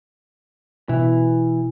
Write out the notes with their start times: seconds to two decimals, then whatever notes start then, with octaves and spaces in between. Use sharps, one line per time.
0.89 B2 E3